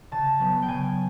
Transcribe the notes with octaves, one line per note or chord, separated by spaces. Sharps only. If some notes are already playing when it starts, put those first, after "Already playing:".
C#3 A5
F#3 B3
G5
C#3 G#5